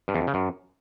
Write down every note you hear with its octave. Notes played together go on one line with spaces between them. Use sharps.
G2
E2
F2
C#3
F#2